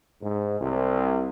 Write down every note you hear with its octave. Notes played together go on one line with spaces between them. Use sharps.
G#2
C2